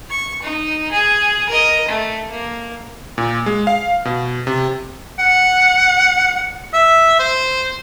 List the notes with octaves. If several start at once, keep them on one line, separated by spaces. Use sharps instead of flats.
C#6
D#4
G#4
A#4 D#5
A3
A#3
A#2
G#3
F5
B2
C3
F#5
E5
C5